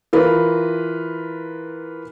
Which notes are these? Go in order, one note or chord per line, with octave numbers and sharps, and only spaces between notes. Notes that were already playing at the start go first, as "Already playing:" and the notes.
E3 F4 A#4 B4